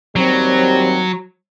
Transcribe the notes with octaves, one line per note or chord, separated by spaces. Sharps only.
D#2 F#3 G3 C4